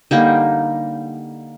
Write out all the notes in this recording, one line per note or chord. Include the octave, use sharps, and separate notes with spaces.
D3 G3 A#3 D#4